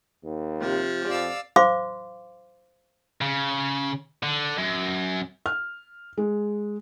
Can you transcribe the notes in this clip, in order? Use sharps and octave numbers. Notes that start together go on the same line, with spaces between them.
D#2
C3 F3
F2 D5 F5 E6
C5 F5 C6 D6
C#3
D3
F#2
F6
G#3